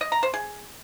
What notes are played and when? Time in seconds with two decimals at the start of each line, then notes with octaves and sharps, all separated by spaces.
0.01 D#5
0.12 A#5
0.23 C5
0.34 G#4